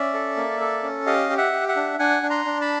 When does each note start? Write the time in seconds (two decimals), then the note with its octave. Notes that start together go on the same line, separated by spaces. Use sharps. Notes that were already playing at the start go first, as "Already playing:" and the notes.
Already playing: C#4 D5 E5
0.14 A4
0.36 A#3
0.60 A4
0.83 C#4
1.06 G4 D#5 F5
1.30 G4
1.38 E5 F#5
1.53 G4
1.68 E5 F#5
1.76 D4
1.99 D4 F#5 G#5
2.23 D4
2.30 A#5 C6
2.45 D4
2.61 A5 B5